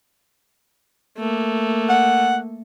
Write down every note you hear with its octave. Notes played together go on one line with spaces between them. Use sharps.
A3 A#3
F#5